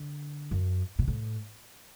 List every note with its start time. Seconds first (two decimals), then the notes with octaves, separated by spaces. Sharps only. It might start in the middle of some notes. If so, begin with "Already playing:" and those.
Already playing: D3
0.51 F#2
0.99 B2
1.08 A2